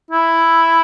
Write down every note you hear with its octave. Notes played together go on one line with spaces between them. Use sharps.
E4